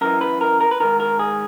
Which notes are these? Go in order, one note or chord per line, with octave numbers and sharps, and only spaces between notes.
F#2 E3 A#4
B4
A#4
A#4
B4
G#2 D#3 A#4
A#4
G#4